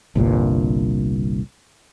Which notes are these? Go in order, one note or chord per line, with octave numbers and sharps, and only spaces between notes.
G1 C2 G2 A#2